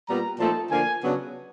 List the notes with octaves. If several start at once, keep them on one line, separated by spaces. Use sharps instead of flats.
A#2 G3 B3 A#5
A#2 F3 A3 C4 D#4 A5
D3 F3 A#3 G#5
C#3 F#3 B3 D4